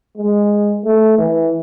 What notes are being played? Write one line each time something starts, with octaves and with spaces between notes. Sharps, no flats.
G#3
A3
E3